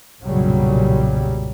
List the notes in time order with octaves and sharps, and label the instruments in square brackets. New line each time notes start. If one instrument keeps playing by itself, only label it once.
[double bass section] B1 F#2 A#2 C#3 F#3 G3